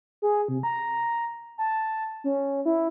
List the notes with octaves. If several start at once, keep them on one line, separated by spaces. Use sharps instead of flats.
G#4
C3
A#5
A5
C#4
E4